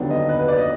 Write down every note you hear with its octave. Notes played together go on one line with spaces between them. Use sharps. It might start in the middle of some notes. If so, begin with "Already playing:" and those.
Already playing: D#2 D3 F#3 B3 D4
D#5
B4
B4
D5
D#5